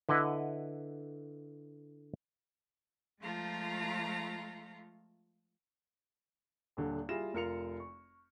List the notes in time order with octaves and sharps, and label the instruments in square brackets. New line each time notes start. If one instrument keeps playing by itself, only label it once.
[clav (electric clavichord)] D3 E4 B4 D#5 F#5
[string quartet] F3 G#3 A3 F4 A#5
[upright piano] D#1 D3 D4
G3 E4 F4 G#4 A#6 E7
F1 F4 A#4 C#7 F7
C#6